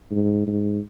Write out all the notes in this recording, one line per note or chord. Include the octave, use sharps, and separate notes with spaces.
G#2
G#2